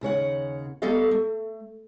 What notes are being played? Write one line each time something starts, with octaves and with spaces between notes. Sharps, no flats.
D#2 C#3 C#5 F#5
G3 A3 B3 A4 D#5 F5
A3